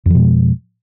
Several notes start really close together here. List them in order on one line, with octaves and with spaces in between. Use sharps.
F2 F3 B2 G#3